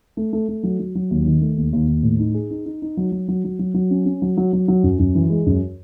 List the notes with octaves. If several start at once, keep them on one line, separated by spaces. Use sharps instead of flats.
A3
A3
A3
F#3
F#3
F#3
D#2
D#3
A3
D#2
D#2
D#2
A2
D#4
G#4
D#4
D#4
D#4
F#3
F#3
F#3
F#3
F#3
F#3
C#4
C#4
F#3
F#3
F#3
F#3
F#2
F#2
E3
G#3
F#2